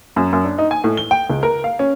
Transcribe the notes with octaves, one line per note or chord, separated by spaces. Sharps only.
F#2
F#2
D4
D#4
G#5
A2
G7
G5
C#2
A#4
F5
C#4